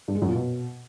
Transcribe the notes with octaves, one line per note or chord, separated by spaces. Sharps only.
G2
G#3
F#2
A#2
B2